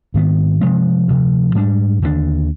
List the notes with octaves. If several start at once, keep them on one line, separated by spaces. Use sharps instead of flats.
G#2 D#3 B3
C3 F3 G#3 C4
D2 C3 F3
G#2 G3 D4
D#2 D3 G#3 D4